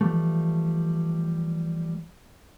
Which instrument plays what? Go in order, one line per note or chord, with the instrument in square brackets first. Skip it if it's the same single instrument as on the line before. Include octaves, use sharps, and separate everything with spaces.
[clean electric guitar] E3 F3 G3 A3